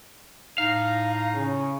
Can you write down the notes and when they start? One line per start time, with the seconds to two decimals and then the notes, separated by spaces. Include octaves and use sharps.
0.58 A2 D#4 F5
1.34 C#3